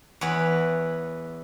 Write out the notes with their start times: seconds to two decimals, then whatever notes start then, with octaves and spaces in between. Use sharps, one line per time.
0.21 E2 B4 C#5 F#5